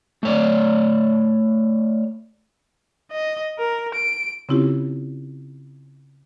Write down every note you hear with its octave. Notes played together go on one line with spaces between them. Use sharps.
A3 C#5 D5
D#5
A#4
D7
C#3 C4 C#4 E4 F4 G4